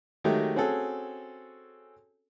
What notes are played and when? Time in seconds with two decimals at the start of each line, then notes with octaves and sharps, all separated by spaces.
0.24 D#3 F#3 G#3 A3 G4
0.56 C4 C#4 F#4 G#4 A4